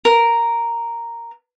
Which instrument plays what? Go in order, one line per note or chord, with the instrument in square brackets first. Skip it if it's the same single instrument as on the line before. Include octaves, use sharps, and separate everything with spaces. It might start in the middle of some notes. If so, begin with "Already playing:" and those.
[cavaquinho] A#4